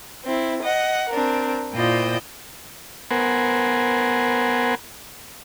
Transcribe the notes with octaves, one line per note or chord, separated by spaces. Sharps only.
C4 E4
D#5 F#5
C4 D4 A#4
A#2 E4 F4 C5 D#5 G5
B3 A#4 C5 F#5 G#5